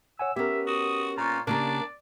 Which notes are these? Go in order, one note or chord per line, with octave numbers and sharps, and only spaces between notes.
C#5 F#5 G#5 E6
B3 C#4 G4 A#4 E5
F#4 D#6
A#2 F4 A#5 C#6
C#3 A#3 D4 G4 A#4 D5 A#5